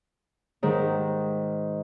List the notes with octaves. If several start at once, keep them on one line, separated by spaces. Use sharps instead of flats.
G#2 D#3